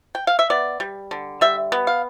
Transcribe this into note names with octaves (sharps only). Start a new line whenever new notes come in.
G5
F5
E5
B3 D5
G3
D3
G3 E5
B3
F5